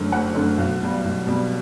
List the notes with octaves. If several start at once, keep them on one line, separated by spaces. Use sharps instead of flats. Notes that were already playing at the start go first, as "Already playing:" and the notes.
Already playing: F#1 F#2 D3 A3
F#1 F#5
F#2 D3 A3
B1
B2 G3
B1
B2 G3